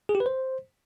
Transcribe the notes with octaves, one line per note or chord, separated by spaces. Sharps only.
G#4
G4
B4
C5